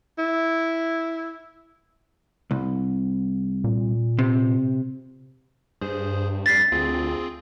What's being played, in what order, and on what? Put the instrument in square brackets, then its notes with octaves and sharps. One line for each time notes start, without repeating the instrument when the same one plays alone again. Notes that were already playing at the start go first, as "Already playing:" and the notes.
[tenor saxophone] E4
[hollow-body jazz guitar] C2
[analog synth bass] A#2
[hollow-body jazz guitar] C3
[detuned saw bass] G2 [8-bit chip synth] G#4 C5
[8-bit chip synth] F2 G3 [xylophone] A6 B6 C7
[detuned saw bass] D2 [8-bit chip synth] C4 F4 G#4